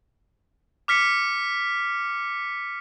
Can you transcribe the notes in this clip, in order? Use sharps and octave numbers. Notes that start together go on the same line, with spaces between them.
D6 F6 B6 C#7